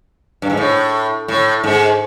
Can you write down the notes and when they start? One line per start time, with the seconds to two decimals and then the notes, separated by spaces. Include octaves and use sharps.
0.42 G2
0.50 G#2
0.57 A2
1.28 A2
1.64 G#2